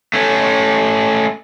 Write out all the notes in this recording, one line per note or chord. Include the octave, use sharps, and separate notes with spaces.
A3 C#4